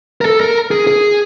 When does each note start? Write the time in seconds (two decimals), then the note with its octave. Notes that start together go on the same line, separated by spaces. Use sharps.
0.21 A#4
0.25 A4
0.41 A#4
0.71 G#4
0.87 G#4